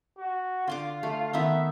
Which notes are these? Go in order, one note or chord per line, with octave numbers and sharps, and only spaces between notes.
F#4
D3 F4 C6 D6
A3
D#3 B3 D#4 E5